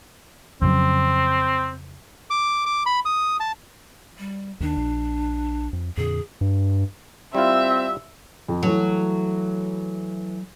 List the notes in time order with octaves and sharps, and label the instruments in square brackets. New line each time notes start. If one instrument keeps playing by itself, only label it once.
[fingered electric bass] F2 C#3 F#3 [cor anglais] C4
[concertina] D6
D6
B5
D#6
A5
[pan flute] G3
[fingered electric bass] D#2 D#3 [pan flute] D4
[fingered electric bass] A#1
F2
[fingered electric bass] F2 A#2 D3 [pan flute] G#4
[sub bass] G2
[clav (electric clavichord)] G3 E4 F4 [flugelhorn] C4 [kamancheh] E5
[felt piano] F2
[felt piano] E3 A3 [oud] F#3